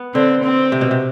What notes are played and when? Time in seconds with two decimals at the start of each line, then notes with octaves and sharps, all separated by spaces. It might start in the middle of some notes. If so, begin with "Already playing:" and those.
Already playing: B3
0.14 D3 C4
0.43 C4
0.72 C3
0.81 B2
0.91 C3